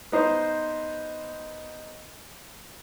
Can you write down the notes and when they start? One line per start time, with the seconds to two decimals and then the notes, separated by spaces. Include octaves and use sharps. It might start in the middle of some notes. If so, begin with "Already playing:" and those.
0.12 B3 D#4 C5